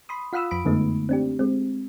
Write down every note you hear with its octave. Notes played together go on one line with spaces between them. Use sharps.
B5 C6 D#6
F4 F5 F#5 B5 D#6 E6
F2 B5 D7
F#2 D3 G#3 A3 B3 D#4
C4 D4 G4
G#3 C4